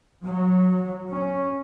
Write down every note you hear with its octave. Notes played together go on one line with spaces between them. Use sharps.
F#3
C#4